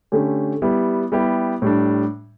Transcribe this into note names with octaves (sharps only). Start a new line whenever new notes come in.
D3 A3 C#4 G4
G3 B3 E4 G4
G3 B3 E4 G4
A2 G3 D4